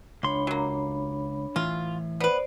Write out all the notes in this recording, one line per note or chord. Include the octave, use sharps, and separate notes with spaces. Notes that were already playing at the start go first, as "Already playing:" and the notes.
C#2 D4 C#5 B5 C6
F#3 A#3
A2 E3 F4
B3 B4 C5 D5